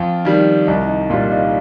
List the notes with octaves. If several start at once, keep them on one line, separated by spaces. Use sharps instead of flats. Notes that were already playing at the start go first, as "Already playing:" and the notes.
Already playing: F2 F4
D#3 G3
C2 D#4
D#4
A#2 G3 F4
D#4